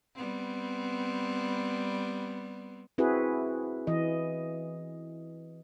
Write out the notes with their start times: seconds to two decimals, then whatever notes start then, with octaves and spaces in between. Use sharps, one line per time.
0.15 G3 B3 C4
2.98 C4 E4 F#4 G#4 B4
3.87 E3 D#5